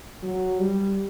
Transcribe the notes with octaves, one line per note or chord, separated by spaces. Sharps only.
F#3
G3